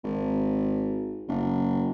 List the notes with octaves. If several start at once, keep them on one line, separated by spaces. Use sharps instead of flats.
G#1
F#1